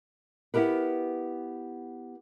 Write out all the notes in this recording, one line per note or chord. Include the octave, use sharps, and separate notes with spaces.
B3 E4 G4 A#4 B4